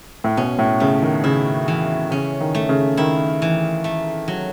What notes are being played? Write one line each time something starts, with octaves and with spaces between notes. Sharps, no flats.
A2
B2 C#4
A2
C#3 A3
D#3
C#3 E4
E3
C#3 C#4
D#3
A3
C#3
D#3 E4
E3
A3
F#3